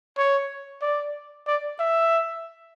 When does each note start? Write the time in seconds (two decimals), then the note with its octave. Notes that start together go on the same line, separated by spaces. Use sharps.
0.18 C#5
0.82 D5
1.47 D5
1.79 E5